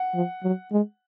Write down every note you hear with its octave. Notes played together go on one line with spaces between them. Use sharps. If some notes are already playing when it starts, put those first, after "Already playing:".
Already playing: F#5
F3
F#3
G#3